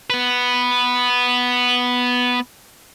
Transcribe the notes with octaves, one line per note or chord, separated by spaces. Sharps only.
B3 B4